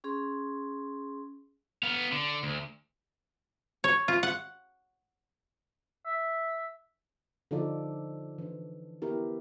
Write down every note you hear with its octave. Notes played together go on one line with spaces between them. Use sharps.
C#4 G#4 C6
B3 F5
D3
D2
C#5
F4
F#5
E5
D3 F3 D#4 F4 A4 D5
E3 D4
B3 E4 G4 A#4